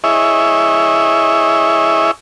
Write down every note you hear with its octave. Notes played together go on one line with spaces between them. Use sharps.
E4 G#4 C#5 D#5 E5 C#6